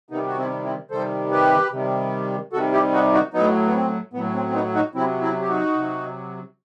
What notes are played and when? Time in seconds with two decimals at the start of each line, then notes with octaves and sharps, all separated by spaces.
0.11 C3 D#3 G3 B3 D#4
0.26 F#4
0.37 C4 E4
0.64 C4 E4
0.91 C3 D#3 G3 A4 C5
1.31 G4 B4
1.72 C3 D#3 G3
2.53 C3 D#3 G3 F#4 A4
2.73 E4 G4
2.93 D#4 F#4
3.13 D#4 F#4
3.34 A2 F#3 B3 D#4
3.67 B3
3.74 C4
4.14 A2 F#3 B3
4.34 C4
4.48 C4
4.54 B3 D#4
4.74 D#4 F#4
4.95 C3 F#3 C4 E4
5.21 C4 E4
5.41 G4
5.48 D#4 F#4
5.75 C3 F#3